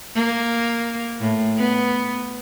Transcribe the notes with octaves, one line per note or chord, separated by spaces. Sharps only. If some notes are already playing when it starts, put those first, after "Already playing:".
A#3
A2
B3